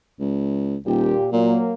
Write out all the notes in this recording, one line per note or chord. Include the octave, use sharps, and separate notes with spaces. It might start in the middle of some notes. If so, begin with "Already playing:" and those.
C#2
D#1 A#2 G4
A#2 F#3 A#3